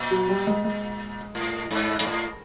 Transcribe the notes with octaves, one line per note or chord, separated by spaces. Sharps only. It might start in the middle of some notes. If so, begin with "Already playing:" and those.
Already playing: A#2
F#3
G3
G#3
G#3
A2
G#2
G#2
A2